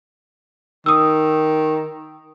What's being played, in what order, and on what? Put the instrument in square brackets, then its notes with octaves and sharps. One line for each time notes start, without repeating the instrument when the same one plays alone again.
[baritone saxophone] D#3 [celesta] D#6 E6